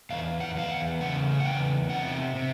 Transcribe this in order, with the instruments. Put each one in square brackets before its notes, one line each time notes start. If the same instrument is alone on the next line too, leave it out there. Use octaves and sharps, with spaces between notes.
[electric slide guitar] E2 F5
F#5
E2 F5
F#5
C#3 F#5
F#5
E2 G5
C3 F#5
C3